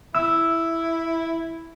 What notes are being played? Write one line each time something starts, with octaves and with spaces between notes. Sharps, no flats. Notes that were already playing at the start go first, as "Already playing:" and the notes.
E4 E6